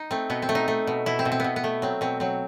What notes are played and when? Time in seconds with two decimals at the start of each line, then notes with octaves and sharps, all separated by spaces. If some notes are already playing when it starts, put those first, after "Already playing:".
Already playing: D#4
0.11 A3 C4
0.30 B2 B3
0.42 C4
0.49 A3
0.55 D#4
0.68 A3
0.87 B2
1.06 B2 E4
1.19 C4
1.25 B2
1.32 C4
1.40 B2 B3
1.56 B3
1.64 A3
1.82 F#3 C4
2.01 B2 C4
2.20 F#3 C4